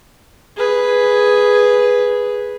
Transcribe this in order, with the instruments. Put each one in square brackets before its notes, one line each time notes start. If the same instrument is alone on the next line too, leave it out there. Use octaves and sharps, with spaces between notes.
[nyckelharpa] G#4 B4